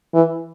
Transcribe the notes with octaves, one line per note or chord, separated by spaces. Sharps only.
E3